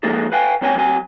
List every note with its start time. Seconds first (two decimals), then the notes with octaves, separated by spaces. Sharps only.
0.03 F3 G#3 A#3 D#4 G#4 A4
0.32 B4 F5 G5 G#5
0.61 F#3 C4 C#5 G5 G#5
0.75 F#3 C4 G#5